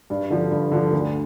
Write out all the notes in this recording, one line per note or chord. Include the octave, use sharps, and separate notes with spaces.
G2
D3 F3
G2
D3 F3
D2